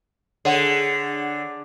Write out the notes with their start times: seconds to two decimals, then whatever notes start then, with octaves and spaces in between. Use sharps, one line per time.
0.45 D3 G#4 C#5 F#5